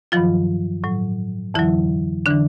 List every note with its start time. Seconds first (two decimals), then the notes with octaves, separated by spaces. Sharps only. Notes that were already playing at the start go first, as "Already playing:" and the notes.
0.12 G2 D#3 F3 F#3 F4
0.84 A2 F#3
1.54 F2 D3 E3 F#3 E4
2.26 D3 E3 D4